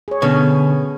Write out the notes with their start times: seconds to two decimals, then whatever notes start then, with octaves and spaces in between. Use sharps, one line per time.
0.08 G#4 C#5
0.22 B2 D3 C#4